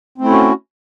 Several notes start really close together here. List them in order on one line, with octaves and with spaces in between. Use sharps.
C4 A3 E4 C#4 F#4